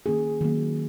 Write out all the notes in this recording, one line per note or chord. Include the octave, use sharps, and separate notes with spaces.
D#3 A#3 C#4 G#4
D#3 F#3 A#3